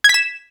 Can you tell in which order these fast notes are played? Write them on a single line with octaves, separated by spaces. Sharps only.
G#6 B6 E7